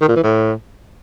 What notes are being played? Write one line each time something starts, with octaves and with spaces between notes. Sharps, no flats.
D#3
A#2
E3
A2